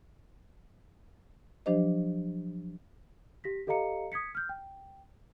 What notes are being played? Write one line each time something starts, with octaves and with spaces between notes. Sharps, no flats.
F3 F#3 D4 G4 C5 D#5
G4 A#6 B6
G4 A4 D#5 F5 A#5 C#7
D#6 G#6 B6 C#7
F6 G6
G5